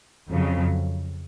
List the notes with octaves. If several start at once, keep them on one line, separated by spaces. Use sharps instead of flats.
F2 C#3 F#3